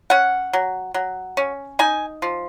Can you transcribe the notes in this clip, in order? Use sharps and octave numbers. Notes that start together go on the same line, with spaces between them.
C#4 F#5
F#3
F#3
C#4
D#4 G#5
F3